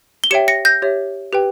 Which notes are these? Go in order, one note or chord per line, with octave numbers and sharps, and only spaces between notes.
G7
G4 C#5 E5 G5 C#7 E7
A#6 C#7
G6 A#6
G4 C#5 E5
G4 B4 G5